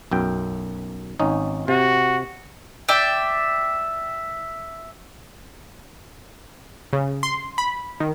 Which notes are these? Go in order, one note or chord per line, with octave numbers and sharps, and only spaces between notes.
B1 F#2 G5
G#1 C#4 D#4
C3 F#4
D5 E5 G5
C#3
C6
B5
D#3